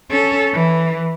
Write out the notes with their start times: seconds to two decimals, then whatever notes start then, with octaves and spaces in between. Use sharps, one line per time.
0.10 C#4 A4
0.53 E3